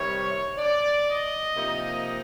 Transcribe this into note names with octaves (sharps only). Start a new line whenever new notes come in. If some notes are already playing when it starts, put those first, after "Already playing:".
Already playing: C3 D#3 G3 C#5
D5
D#5
C3 F3 A#3 D#4